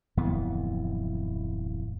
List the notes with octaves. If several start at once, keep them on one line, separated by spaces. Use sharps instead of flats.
D1 F2 E3 B3